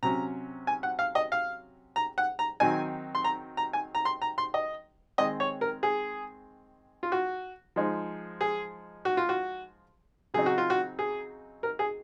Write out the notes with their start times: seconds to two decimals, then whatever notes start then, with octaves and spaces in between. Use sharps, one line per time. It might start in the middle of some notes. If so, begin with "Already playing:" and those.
0.03 C3 F#3 C#4 A#5
0.67 G#5
0.83 F#5
0.99 F5
1.15 D#5
1.32 F5
1.96 A#5
2.18 F#5
2.39 A#5
2.60 D#3 F#3 C4 D#4 G#5
3.15 C6
3.24 A#5
3.57 A#5
3.73 G#5
3.95 A#5
4.05 C6
4.22 A#5
4.38 C6
4.54 D#5
5.18 D#3 G#3 C4 D#5
5.40 C#5
5.61 A#4
5.83 G#4
7.03 F4
7.12 F#4
7.76 F3 G#3 D#4
8.41 G#4
9.05 F#4
9.17 F4
9.29 F#4
10.34 C#3 F#3 C4 D#4 G#4
10.46 F#4
10.58 F4
10.70 F#4
10.99 G#4
11.63 A#4
11.79 G#4